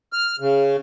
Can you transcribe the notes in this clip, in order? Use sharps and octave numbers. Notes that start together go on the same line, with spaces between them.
F6
C#3